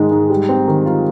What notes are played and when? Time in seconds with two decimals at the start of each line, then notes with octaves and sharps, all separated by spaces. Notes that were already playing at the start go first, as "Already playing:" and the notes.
Already playing: G#2 D#3 G#3
0.11 G#2
0.30 G3
0.49 C4
0.67 D#3
0.86 F4